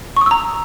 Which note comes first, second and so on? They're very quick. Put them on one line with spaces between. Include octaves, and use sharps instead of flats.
C#6 D#6 E6 A#5